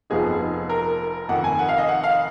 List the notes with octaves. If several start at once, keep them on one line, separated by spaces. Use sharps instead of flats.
F1 F2 F3 B3 D#4 G#4
A#4
F1 F2 D#3 F#5
G#5
F#5
F5
D#5
F#5
F5